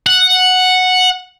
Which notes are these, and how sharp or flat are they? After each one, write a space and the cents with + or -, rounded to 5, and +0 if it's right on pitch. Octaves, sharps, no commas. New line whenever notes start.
F#5 -5